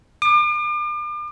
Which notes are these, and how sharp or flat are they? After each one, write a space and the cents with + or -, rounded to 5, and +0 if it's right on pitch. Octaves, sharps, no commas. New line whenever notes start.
D6 +40